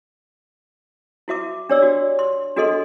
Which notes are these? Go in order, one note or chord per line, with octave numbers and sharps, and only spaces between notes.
E4 F#4 E5 D6
D4 G4 C#5 D5 E6
F#4
C6
D4 F#4 G#4 A4 D#5 C6